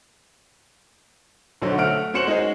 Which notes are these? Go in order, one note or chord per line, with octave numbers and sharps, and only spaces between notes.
B1 D3 F#3 C5
A3 E5 F#5 F6 D7
C#4 F#4 C5 C#7 E7 F#7
G#3 D#4 F#4 G#4